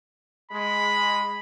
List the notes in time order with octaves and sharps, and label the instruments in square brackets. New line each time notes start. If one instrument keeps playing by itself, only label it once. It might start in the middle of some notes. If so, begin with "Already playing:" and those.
[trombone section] G#3 [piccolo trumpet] B5